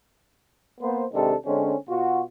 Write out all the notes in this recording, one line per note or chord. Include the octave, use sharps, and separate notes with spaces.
A#3 B3 C5
C3 D#3 G#3 D4 A4
D3 G#3 C4 C#4
B2 F4 F#4